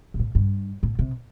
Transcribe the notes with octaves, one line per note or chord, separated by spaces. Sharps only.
A#2
A2
G2
A2
C3